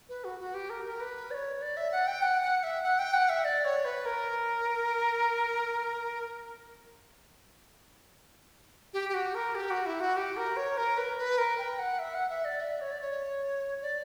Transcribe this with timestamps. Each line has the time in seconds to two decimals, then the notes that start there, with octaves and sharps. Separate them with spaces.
0.09 B4
0.24 F#4
0.39 F#4
0.54 G4
0.70 A#4
0.85 A#4
1.00 B4
1.31 D5
1.34 C#5
1.62 D5
1.77 E5
1.92 F#5
2.07 G5
2.22 F#5
2.43 F#5
2.63 E5
2.83 F#5
2.99 G5
3.14 F#5
3.29 E5
3.45 D5
3.65 C#5
3.85 B4
4.05 A#4
8.93 G4
9.09 G4
9.14 F#4
9.35 A#4
9.55 G4
9.70 F#4
9.86 E4
10.00 F#4
10.16 G4
10.37 A#4
10.56 C#5
10.77 A#4
10.97 B4
11.18 B4
11.38 A#4
11.58 G5
11.79 F#5
11.99 E5
12.14 F#5
12.30 E5
12.45 D5
12.61 E5
12.81 C#5
12.91 D5
13.01 C#5
13.82 D5